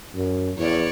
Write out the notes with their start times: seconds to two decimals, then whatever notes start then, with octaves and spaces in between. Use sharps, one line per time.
0.15 F#2
0.58 E2 C#5 D5